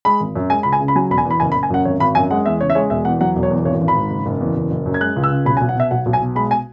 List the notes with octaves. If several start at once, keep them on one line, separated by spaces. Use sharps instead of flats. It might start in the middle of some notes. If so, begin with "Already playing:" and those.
G#3 B5
G#1
F#2
G#3 G#5
C#2 B5
G#5
C#3
B5
F#3 G#5
E1 B5
G#5
E2
B5
F#1 G#5
B5
F#1
G#5
F#2 F#5
G#1 C#5
G#1 B5
F#2 G#5
G#3 F#5
E2 E5
C#3 C#5
E5
G#3 C#5
E1 E5
E2 F#5
F#3 F#5
E1
C#5
E2
G#1 C#5
G#1
B5
G#2
F#1
F#1
E2
F#1
F#1
F#2
G#6
G#3 F#6
C#2
E6
C#3
B1 B5
G#5
B1
F#5
B2 E5
B1 F#5
B1
G#5
B2
G#3 B5
G#5